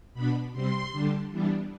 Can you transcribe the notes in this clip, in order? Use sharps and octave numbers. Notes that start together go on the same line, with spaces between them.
B2 B3 D4 B5
C3 G3 C4 C6
D3 G3 D4
E3 G3 B3 D4